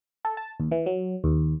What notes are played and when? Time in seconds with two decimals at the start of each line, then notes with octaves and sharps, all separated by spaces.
0.25 A4
0.37 A5
0.60 D#2
0.71 E3
0.86 F#3
1.24 D#2